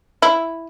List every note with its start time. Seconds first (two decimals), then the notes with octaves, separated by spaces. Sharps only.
0.22 E4